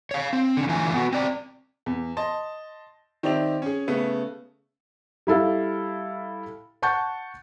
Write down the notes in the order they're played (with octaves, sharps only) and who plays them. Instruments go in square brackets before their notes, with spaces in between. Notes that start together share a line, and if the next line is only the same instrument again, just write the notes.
[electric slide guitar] C#5 F5
C4
D3 C#4
D3 E3 A3 F4 G#5
B3 F#4
C4 D5
[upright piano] E2
D#5 A5 C6
D#3 C4 G4 D5 E5 F7
C#4 G#4
C#3 A3 B3
[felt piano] G3 E4 A4 F5
F#5 A5 C#6 G6